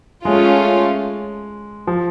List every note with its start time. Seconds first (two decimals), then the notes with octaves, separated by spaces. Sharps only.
0.25 G#3 A3 C#4 F4
1.87 F3